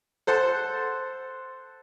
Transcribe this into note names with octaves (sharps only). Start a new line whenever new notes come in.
A4 C5 F#5 A5